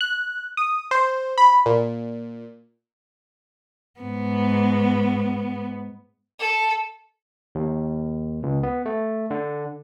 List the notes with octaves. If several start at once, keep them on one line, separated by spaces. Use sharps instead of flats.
F#6
D#6
C5
B5
A#2
G#2 B3
A4
D#2
C#2
B3
A3
D3